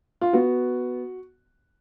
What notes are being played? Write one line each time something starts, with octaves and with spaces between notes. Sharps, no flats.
F4
B3 F#4